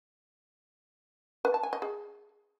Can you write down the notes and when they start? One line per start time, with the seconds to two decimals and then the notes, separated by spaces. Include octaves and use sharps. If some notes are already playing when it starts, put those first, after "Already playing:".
1.45 B4
1.54 A5
1.63 G#5
1.73 D#5
1.82 G#4